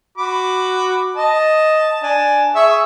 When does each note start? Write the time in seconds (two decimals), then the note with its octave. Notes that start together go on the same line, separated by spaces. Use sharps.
0.18 F#4 B5 D6
1.16 D#5 A5
2.03 D4 G#5 A5
2.55 G#4 E5 C#6